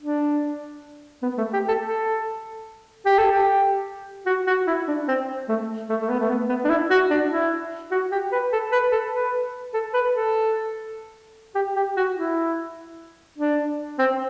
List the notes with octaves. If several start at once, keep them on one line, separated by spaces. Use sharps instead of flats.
D4
B3
A3
G4
A4
A4
G4
A4
G4
F#4
F#4
E4
D4
C4
A3
A3
A3
B3
A3
B3
B3
D4
E4
F#4
D4
E4
F#4
G4
B4
A4
B4
A4
B4
A4
B4
A4
G4
G4
F#4
E4
D4
C4